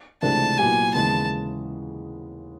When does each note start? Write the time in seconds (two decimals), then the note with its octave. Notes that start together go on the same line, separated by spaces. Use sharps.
0.22 C#2 C3 E3 A3 D4 A5
0.58 A#2 F#3 B3 E4 G4 G#5
0.94 D#2 C#3 E3 G#3 B3 A5